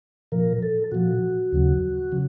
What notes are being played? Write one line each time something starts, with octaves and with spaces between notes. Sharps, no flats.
A#2 F3 A#4
A4
A#2 F3 F#4
D#2 C#3 F#3
C#3 F#3